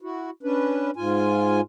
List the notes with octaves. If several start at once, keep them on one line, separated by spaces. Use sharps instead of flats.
E4 F#4
C#4 D4 B4
G#2 F4 G#5